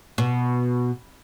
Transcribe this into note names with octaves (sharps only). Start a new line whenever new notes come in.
B2